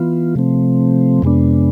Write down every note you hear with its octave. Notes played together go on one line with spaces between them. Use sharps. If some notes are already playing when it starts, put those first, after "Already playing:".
Already playing: E3 B3 F4
C3 F3 A3 C4
F2 C3 G#3 B3 D4